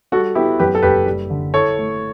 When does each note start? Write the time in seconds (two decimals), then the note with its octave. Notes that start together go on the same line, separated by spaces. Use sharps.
0.12 G3 F#4 A4
0.35 B3 E4 G4
0.59 F#2 G4 B4
0.75 A4
0.82 F#1 G4 B4
1.06 G3
1.30 D3
1.54 E4 A4 C#5
1.77 A3